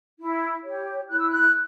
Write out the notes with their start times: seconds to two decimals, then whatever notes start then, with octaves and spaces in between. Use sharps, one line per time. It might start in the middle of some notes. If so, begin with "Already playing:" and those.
0.19 E4
0.64 G4 C#5
1.08 E4 F#6
1.19 E6
1.29 F#6